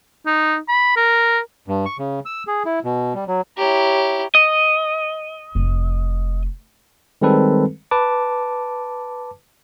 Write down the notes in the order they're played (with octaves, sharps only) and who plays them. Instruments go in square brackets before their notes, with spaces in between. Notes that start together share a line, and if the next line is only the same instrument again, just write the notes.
[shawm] D#4
B5
A#4
[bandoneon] G2
C#6
C#3
E6
G#4
E4
B2
G3
F#3
[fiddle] E4 G4 [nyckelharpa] C#5 A#5
[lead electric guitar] D#5
[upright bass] F1
[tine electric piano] D#3 G3 G#3 C4 A4 B4
B4 A5 D6